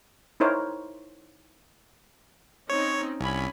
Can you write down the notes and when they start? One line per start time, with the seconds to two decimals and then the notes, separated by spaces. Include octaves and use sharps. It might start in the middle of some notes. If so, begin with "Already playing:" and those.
0.40 D#4 E4 A#4 C5 C#5
2.70 C4 C#4 D#4 C#5
3.20 C2 C#4 G#5 B5